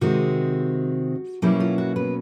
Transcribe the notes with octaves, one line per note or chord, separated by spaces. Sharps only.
C3 D#3 G#3 C4 F#4
B2 F#3 G3 A#3 C#4 E4 G4
F4
F#4
B3 B4